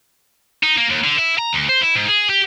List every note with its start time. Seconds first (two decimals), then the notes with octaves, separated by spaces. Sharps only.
0.63 D#4
0.77 A#3
0.90 D#2
1.04 D3
1.18 E4
1.39 A#5
1.53 D2
1.69 C5
1.81 E4
1.95 G#2
2.08 G#4
2.30 G4